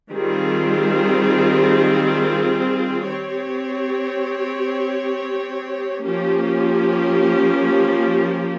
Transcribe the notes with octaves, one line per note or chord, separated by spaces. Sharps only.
D#3 G3 C4 F4 G#4
C4 G4 C#5
F3 A#3 C#4 G4